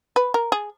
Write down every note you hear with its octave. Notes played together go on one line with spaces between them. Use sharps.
B4
A#4
G#4